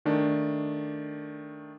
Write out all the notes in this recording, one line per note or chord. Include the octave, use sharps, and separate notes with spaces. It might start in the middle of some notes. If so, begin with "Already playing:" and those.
D#3 A3 D4